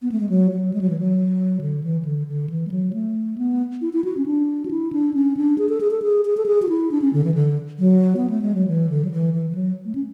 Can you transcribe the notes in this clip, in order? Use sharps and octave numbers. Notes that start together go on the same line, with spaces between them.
B3
A3
G#3
F#3
F#3
G#3
F#3
E3
F#3
D3
E3
E3
D3
D3
E3
G#3
F#3
A3
B3
E4
E4
F#4
C#4
D4
F#4
E4
D4
C#4
D4
G#4
A4
G#4
A4
G#4
G#4
A4
G#4
F#4
E4
D4
C#4
D3
E3
D3
F#3
B3
A3
G#3
F#3
E3
D3
F#3
E3
E3
E3
F#3
A3
C#4